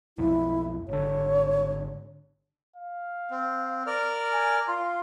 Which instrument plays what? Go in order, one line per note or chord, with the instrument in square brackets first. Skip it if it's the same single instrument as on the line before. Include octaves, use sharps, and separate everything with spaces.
[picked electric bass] B1 F2 [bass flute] E4
[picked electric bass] G#1 D3 [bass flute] C#5
[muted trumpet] F5
[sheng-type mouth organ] C4
A#4 D5 F6
[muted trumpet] G#5
[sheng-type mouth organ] F4 [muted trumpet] C6